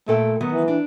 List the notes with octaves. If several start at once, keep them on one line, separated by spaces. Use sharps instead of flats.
A#2 A3 A4 G5
D#3 F#3 B3
E3
D4